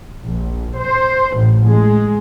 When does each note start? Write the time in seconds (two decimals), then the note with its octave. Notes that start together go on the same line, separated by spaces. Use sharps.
0.24 A#1
0.79 C5
1.37 A1
1.69 G#3